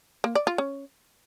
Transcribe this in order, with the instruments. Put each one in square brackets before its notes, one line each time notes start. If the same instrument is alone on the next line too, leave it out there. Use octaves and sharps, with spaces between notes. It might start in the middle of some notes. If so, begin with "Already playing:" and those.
[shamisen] A#3
D5
F4
C#4